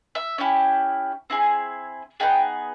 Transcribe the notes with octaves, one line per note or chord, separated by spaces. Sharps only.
E5
C#4 E4 G4
C4 E4 G#4
B3 D#4 G#4 G5